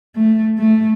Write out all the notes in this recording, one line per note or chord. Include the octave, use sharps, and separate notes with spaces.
A3
A3